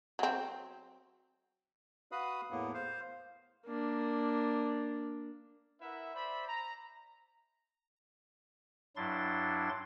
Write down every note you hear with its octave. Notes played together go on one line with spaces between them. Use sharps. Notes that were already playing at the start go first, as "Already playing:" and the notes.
F#3 C4
F#4 B4 F5 B5 D#6
E2 A2 A#3 B3
C5 F5
A#3 D4
E4 A#4 B4 E5 F#5
C5 D5 E5 B5
A#5
G2 F#3 D4 E4 C6 A6